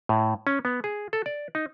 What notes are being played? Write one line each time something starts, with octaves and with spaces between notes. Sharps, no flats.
A2
C#4
B3
G#4
A4
D5
D#4